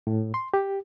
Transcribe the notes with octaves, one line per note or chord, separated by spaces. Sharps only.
A2
C6
G4